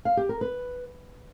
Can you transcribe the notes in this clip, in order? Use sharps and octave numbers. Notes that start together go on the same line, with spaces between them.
F5
G4
A#4
B4